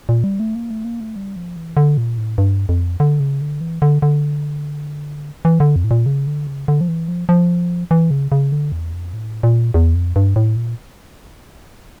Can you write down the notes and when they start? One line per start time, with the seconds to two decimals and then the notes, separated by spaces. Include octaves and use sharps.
0.09 A#2
0.24 G3
0.40 A3
0.55 A#3
0.70 A3
0.85 A#3
1.00 A3
1.16 G3
1.36 F3
1.56 E3
1.77 D3
1.97 A#2
2.18 A2
2.38 G2
2.69 F2
3.00 D3
3.20 C#3
3.41 D3
3.61 E3
3.82 D3
4.02 D3
5.45 E3
5.60 D3
5.76 F2
5.84 A2
5.91 A#2
6.06 C#3
6.27 D3
6.47 C#3
6.68 D3
6.81 F3
6.88 E3
7.08 F3
7.29 F3
7.91 E3
8.11 C#3
8.32 C#3
8.52 D3
8.72 E2
8.93 F2
9.13 A2
9.43 A#2
9.74 E2
9.95 F2
10.16 G2
10.36 A2
10.56 A#2